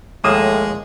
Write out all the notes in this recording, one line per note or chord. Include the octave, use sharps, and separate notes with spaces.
D#2 A2 F3 G#3 A#3 D#6 E7